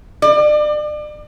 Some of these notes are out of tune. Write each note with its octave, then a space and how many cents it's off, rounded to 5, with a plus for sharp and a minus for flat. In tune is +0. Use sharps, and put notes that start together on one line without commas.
D5 +35